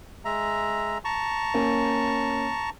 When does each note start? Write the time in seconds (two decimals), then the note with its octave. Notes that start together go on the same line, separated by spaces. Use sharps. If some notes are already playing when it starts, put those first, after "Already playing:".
0.25 G#3 E5 A#5
1.05 A5 A#5 C#6
1.54 A#3 C#4